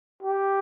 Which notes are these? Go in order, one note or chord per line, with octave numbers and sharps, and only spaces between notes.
G4